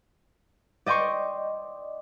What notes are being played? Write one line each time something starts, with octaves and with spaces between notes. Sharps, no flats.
D5 D#5 G5 C6 C#6